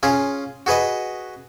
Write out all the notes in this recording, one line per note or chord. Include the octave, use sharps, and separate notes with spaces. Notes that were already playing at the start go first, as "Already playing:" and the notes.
C#4 F4 G#4
F#4 G#4 B4 D#5